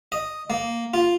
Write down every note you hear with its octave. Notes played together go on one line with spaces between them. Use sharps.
D#5
A#3
F4